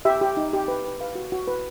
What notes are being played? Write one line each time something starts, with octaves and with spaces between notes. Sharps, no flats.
G4 E5
G4
D#4
G4
B4
B4
B4 F5
F#4
F#4
B4